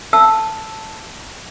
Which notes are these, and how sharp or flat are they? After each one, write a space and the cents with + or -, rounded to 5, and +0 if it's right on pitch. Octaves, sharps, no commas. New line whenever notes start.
A5 +0 E6 +0